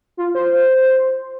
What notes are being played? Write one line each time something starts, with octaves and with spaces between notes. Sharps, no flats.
F4
C5